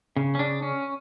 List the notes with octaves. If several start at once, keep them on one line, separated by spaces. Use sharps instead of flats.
C#3
C#4
C#3 D4
C#4